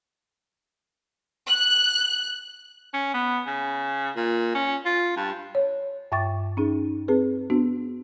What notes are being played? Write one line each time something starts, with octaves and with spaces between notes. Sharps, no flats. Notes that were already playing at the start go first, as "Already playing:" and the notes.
F#6
C#4
B3
C#3
A#2
C#4
F4
G2
C#5
G2 E5 G5 C#6 D6 A6
C#4 D#4 G#4
C4 G#4 B4
B3 D4 F#4